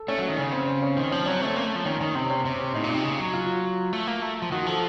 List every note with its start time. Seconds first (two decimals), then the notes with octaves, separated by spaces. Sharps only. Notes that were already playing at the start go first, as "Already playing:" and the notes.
Already playing: A4
0.08 A3 C#4
0.18 F#3 C#4
0.28 D#3
0.37 C#3 C#4
0.52 C4
0.67 C#4
0.82 C#4
0.97 D#3 C4
1.11 F3 C#4
1.26 F#3 C#4
1.36 C4
1.42 A3 C#4
1.56 A#3 C#4
1.66 A3
1.75 F3
1.85 D#3 C#4
2.00 D#3 C#4
2.15 C3 C4
2.30 C#4
2.45 C3 C4
2.59 C#4
2.74 A2 D#4
2.84 A#2
2.90 C3 D#4
3.04 C#3
3.19 F#3
3.33 F4
3.93 A3
4.07 A#3
4.22 A3
4.42 F3
4.52 D#3 F#4
4.66 F3 A4